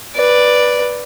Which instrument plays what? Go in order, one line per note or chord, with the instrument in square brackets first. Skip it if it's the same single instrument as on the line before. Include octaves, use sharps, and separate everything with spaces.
[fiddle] B4 D5